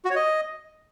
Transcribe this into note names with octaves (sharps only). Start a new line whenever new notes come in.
F#4
C#5
D#5